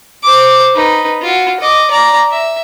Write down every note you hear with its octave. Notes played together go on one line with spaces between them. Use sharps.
C5 D6
D#4 B4
F4 F#4
D#5 D6
D5 A#5
E5